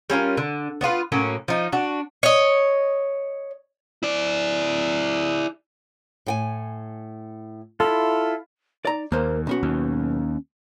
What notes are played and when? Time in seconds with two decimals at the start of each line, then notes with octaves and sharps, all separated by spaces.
0.10 G3 C#4 F4 A#4
0.37 D3
0.81 B3 D4 F4 B4
1.12 A2 F#3 A#3 C#4
1.48 F3 D#4
1.72 D4 F#4
2.23 C#5 D#5
4.03 E4 D5
6.26 A2 G5 G#5
7.80 E4 F4 A4
8.85 D#4 D5 A#5
9.12 D#2 A#3 A#4 C5
9.47 B1 B3 C#4 F#4
9.63 D#2